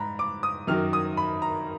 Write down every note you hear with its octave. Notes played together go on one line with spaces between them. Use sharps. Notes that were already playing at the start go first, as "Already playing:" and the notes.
Already playing: G#2 A#5 B5
D6
D#6
F#2 D#3 F#3 F6
D#6
B5
A#5